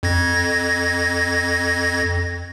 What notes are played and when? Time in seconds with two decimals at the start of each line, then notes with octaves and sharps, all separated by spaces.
0.03 F2 G#6 A#6